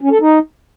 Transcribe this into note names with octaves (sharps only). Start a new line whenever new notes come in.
C#4
A4
D#4